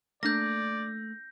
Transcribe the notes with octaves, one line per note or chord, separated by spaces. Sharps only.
A3 A#3 D4 D5 G6 A#6